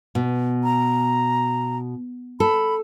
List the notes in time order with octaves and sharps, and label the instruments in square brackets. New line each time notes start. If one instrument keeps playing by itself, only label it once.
[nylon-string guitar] B2
[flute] A#5
[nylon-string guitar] A4 [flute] B5